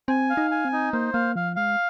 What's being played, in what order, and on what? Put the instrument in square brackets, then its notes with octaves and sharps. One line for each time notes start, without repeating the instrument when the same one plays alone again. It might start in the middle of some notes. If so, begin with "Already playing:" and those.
[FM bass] C4 [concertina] G#5
[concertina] F5
[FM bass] D#4
[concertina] G#5
[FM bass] C4
[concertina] D#4
[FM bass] A#3 [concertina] C5
[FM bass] A#3 [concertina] F5
[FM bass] F3 [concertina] F5
[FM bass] G#3 [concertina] F5